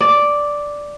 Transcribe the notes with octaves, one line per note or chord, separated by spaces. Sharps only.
D5